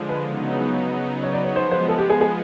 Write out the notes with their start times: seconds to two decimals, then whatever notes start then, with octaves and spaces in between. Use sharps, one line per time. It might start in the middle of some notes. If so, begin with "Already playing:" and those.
Already playing: D3 F3 G#3
0.09 B4
0.25 C#3 F#3 B3 D#4
1.23 C#5
1.33 D5
1.44 C#5
1.55 F3 G#3 B3 C5
1.71 C5
1.88 A4
1.98 G4
2.10 G#4
2.21 G#4